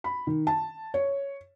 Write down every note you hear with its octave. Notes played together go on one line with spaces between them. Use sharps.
B5
D#3
A5
C#5